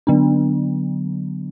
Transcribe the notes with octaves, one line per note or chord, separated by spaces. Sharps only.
D3 F#3 B3 D4